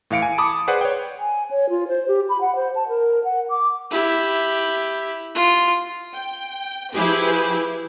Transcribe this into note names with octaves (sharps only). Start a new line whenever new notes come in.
A2 E3 F5 C#7 D7
G#5
A5 B5 D6 D#6
G#4 B4 C5 D5 F#5
C#5 G5
G#5
C#5
F4
C5
G4
B5
F#5
C5
A5
A#4
F#5
D6
E4 G4
F4
G5
F3 E4 G4 G#4 B4